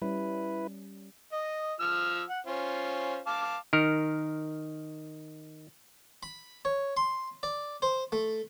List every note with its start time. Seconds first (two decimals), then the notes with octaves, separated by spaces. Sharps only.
0.02 G3 C#4 E4 B4
1.33 D#5
1.80 F3 E6 F6
2.29 F#5
2.47 C#4 F4 C5
3.27 F5 A5 D6
3.73 D#3 A#4
6.23 B5
6.65 C#5
6.97 C6
7.43 D5
7.82 C5
8.12 A3